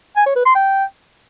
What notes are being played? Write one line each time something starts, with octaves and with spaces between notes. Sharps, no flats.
G#5
C#5
B4
C6
G5